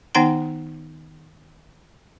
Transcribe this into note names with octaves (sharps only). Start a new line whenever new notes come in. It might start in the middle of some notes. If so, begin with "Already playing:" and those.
D#3 B3 D#4 F#5 G5 A#5